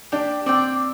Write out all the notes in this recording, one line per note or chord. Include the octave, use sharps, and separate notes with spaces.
D4 G4
C4 D5 G5